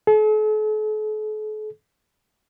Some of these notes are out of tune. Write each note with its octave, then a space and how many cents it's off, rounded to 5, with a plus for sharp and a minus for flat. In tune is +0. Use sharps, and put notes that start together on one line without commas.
A4 -45